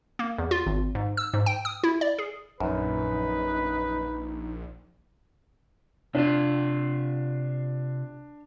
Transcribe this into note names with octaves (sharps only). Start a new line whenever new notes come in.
A#3
E2
F4
G#1
G#2
E6
G#2
G5
D#6
E4
D5
G#4
A#1 F#2 D#4 B4
C3 D4 F4